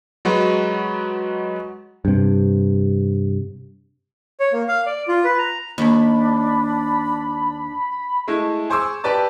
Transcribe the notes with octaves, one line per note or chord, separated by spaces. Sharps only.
F#3 G#3 F#4 B4
G2 C3
C#5
A#3
F5
D5
F4
B4
A#5
D#2 D4 B5
G#3 A3 E4
G#4 C5 C#6 D6 E6
G4 B4 D5 A5